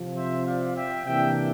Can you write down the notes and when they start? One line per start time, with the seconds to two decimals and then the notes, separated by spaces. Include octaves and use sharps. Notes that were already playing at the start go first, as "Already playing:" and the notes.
Already playing: C3 F3 C4
0.16 C5 E5
0.46 D5 F5
0.76 E5 G5
1.05 C3 E3 A#3 D4 E5 G5